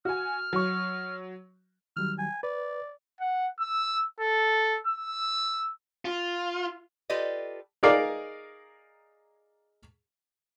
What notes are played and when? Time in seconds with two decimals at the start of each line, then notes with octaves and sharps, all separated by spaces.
0.05 F#4 G#5 F6
0.53 F#3 C#6
1.97 D#3 F#3 G3 F6
2.19 G#5
2.43 B4 D5
3.21 F#5
3.60 E6
4.20 A4
4.87 E6
6.05 F4
7.10 F4 G4 A4 B4 D5 D#5
7.83 D#4 G#4 A#4 D5 F5